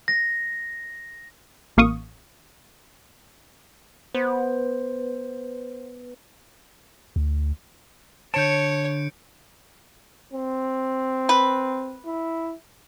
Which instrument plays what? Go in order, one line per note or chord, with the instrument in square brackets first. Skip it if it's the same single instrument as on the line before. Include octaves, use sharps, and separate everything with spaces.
[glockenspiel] A#6
[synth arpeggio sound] A1 A#3 F5 C#6 D#6
[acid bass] B3 [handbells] C5
[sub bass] D2
[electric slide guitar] D3 A5 [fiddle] C#5 [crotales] G6 C#7 D7
[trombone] C4
[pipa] B4
[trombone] E4